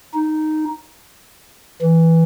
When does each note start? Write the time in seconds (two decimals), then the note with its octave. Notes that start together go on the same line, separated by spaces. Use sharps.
0.14 D#4
1.82 E3